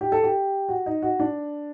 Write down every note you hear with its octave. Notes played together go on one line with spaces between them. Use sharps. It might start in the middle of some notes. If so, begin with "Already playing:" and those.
G4
A4
G4
F#4
D#4
F#4
D4